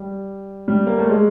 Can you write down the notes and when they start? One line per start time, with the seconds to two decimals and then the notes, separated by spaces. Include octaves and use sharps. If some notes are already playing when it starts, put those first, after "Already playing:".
Already playing: G3
0.68 G3
0.87 A#3
0.98 A3
1.09 G#3